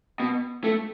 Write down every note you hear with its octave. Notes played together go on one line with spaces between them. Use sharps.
B2
A3